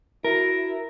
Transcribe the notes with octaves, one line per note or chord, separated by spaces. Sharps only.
E4 F#4 A#4 E5